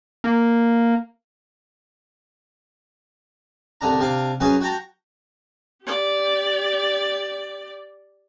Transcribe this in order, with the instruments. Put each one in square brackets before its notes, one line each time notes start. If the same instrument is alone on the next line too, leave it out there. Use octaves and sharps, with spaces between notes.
[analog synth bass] A#3
[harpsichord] C2 D3 D4 A#5
C3 D4 F5
F#2 F#3 C#4 G#4 B4
F#4 F#5 G5 A5 A#5
[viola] G4 D5